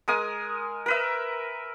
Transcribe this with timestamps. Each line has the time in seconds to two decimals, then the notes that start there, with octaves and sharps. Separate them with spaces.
0.08 G#3 A#4 G#5 D#6
0.86 A#4 B4 E5